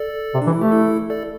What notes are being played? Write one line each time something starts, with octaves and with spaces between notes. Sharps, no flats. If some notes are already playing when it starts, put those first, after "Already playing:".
Already playing: A4 D5
C3
E3 D4
E4
A3 G4
E4 A4
A4 D5